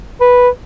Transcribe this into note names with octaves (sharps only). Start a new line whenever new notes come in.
B4